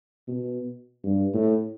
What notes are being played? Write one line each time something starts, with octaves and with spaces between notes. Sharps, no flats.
B2
G2
A2